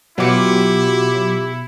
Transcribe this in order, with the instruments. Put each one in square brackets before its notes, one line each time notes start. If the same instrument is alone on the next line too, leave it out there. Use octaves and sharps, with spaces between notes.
[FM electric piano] B2 C#7 [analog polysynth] F#3 D6 [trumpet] E4 [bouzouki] F4 G4